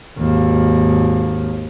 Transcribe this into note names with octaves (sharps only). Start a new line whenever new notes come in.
G#1 D#2